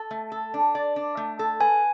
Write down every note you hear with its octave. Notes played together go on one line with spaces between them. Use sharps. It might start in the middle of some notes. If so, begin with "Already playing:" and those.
Already playing: A4
A3
A4
D4
D5
D4
A3
A4
B4 G#5